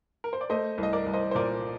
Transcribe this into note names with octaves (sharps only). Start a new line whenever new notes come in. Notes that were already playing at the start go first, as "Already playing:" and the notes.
A#4
C5
D5
A3 C5 D#5
C2
D#5
A#4 D5
C2
C5 D#5
C5
A#2 A#4 D5